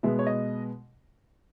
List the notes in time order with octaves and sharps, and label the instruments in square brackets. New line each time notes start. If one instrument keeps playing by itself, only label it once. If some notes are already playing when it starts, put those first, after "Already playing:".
[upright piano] B2 G#3 B3 E5
C#5
D#5